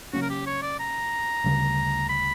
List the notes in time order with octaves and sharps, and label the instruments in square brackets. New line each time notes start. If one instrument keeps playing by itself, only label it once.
[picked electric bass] C#3 F#3 A#3 C#4 [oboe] F#4
[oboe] A#4
G4
C#5
D5
A#5
[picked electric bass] D2 C#3 G3
[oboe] B5